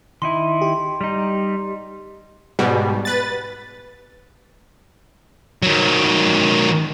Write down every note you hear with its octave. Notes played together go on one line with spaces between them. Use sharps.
D#3 D#4 E4 C6
G4
G3 D#4
G#2 B2 G3
B4 A6
D#3 F#3